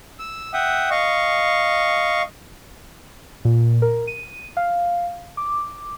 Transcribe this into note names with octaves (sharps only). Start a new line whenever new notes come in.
E6
E5 F#5 G5 D#6
D#5 F5 C#6
A#2
A#4
D#7
F5
D6